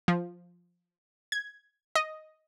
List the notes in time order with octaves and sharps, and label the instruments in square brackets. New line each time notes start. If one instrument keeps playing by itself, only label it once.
[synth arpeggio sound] F3
G#6
D#5